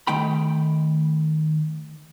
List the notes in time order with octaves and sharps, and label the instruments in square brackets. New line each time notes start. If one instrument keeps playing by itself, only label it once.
[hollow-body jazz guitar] D#3 A3 G5 B5